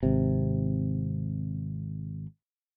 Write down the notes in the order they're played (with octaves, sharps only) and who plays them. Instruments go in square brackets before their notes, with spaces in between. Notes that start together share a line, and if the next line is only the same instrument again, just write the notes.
[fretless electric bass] G#1 C3